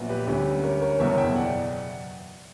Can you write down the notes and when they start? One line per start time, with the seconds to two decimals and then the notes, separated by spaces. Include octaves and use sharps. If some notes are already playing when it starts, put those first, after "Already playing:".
Already playing: A#1 A#2 F#3 B3
0.09 G4 B4
0.27 D2 D3 G3 C#4
0.64 A#4 C#5
0.81 A#4 C#5
0.99 F#1 E2 B2 C#5 E5
1.18 E5 G5
1.36 D5 F#5